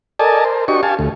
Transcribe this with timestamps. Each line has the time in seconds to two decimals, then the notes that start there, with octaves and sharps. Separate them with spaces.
0.19 A4 A#4 D5 D#5 G#5 A5
0.45 A#4 C5
0.68 D4 F#4 G4 D#5 C#6
0.83 G4 F5 G#5 A5
0.99 D2 A3